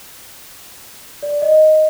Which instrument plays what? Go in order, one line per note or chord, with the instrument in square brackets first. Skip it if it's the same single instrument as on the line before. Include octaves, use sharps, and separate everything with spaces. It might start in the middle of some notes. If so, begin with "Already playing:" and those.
[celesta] D5
D#5